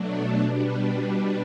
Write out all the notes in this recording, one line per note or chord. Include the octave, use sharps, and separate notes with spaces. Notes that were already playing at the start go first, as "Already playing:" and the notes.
Already playing: B2 F#3 A3 D4
B2 G3 B3 D4